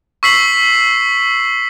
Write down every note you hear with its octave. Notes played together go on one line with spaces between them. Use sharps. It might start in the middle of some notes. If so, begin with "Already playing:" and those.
C#6 E6 B6 C7 F#7